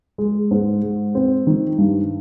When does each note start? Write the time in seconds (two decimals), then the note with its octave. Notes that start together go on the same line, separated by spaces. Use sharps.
0.18 G#3
0.51 G#2
0.82 G#3
1.15 C4
1.47 D#3
1.78 G2